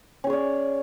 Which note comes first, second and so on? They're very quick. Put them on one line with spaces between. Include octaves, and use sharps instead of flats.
C#4 G#4 C#5 D5